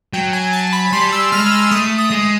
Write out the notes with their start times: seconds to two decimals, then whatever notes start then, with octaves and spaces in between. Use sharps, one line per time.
0.13 F#3 G5
0.33 G#5
0.53 A5
0.73 B5
0.93 G3 C6
1.12 E6
1.32 G#3 F6
1.52 E6
1.71 A3 D#6
1.98 D#6
2.11 G#3